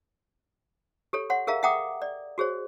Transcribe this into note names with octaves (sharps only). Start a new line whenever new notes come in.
G4 A4 C#5
C#5 F#5 C6
G#4 A#4 E5 F5 A#5
E5 F#5 G5 A#5 D6 D#6
D5
F#4 G#4 C5 C#5